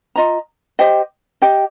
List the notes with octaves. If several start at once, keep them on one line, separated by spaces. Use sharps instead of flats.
F4 D#5 A#5
G4 C5 D#5 G5
G4 D#5 G5